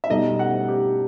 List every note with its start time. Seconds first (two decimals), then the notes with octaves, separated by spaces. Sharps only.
0.04 E5
0.10 B2 G3 D#4 A4 D#5
0.39 F#5
0.68 G4